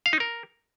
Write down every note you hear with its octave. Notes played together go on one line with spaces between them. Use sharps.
F5
D#4
A#4